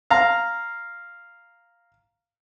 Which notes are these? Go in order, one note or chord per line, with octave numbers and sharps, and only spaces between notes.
F5 A#5